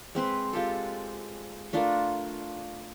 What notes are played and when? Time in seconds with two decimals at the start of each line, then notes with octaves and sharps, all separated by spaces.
0.15 G#3 C4 B4 C6
0.53 G#3 F4 G4 A4
1.73 A3 D4 F4 A#4